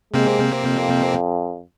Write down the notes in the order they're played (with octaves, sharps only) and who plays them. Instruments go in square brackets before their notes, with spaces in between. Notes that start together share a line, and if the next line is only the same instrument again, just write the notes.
[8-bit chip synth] C3 A#3 C4 [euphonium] G#3
[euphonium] F2